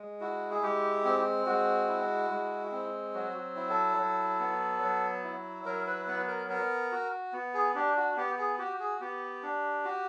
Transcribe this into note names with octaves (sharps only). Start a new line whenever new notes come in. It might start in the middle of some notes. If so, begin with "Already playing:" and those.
Already playing: G#3
E4 F#4
G#4
G#3 G4
C4
G#3 F#4
E4
G#3
C4
F#3 F#4
E4
A4
F#3
B3
F#3
E4
F#3 A#4
B4
B3 B4
A#4
B3 A#4
F#4
B3
G#4
D4 G4
F#4
B3 G4
G#4
F#4 G4
G#4
B3 G4
D4
F#4